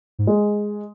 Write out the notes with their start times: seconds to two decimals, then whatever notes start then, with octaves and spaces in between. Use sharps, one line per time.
0.19 G#2
0.27 G#3